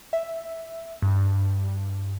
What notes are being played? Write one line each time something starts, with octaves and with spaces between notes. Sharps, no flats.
E5
G2